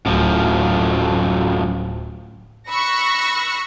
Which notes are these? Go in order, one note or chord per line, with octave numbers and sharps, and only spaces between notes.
D1 F#2 A2 F3
B5 C#6 E6 F#6 A#6 C#7